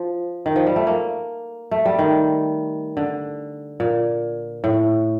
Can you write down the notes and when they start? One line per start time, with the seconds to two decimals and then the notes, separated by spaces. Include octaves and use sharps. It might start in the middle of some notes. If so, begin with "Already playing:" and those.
Already playing: F3
0.46 D#3
0.56 F3
0.67 G3
0.76 A3
0.87 A#3
1.71 A3
1.85 G3
1.99 D#3
2.97 D3
3.80 A#2
4.64 A2